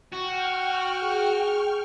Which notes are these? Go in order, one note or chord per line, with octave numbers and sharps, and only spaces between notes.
F#4 G5 C#6 F6
G#4